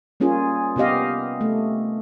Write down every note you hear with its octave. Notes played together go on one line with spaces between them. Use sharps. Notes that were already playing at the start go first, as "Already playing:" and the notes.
G3 A#3 C#4 F4 G#4
C3 B3 G4 D#5 F5
A3